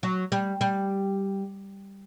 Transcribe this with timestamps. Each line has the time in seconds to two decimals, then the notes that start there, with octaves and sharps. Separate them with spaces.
0.03 F#3
0.32 G3
0.61 G3